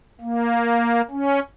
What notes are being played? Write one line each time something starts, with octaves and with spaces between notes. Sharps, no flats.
A#3
C#4